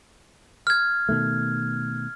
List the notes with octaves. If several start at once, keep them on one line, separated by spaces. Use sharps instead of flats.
F6 G#6
B2 D#3 A3